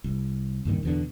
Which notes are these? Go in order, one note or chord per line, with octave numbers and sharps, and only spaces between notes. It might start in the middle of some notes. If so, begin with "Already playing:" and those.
C2
C#2 G2 A#2 D#3
E2 B2 D3